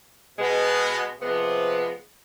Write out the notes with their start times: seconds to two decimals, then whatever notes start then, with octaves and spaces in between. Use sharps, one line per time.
0.38 B2 G#3 B3
1.20 C3 F3 G#3 B3